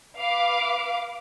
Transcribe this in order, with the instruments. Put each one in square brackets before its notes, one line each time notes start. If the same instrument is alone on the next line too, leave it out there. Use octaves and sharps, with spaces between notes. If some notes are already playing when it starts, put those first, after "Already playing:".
[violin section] B4 F5 D6